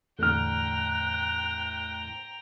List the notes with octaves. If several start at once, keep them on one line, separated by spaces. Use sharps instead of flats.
E2 A2 D3 A3 G5 A#5 F6 F#6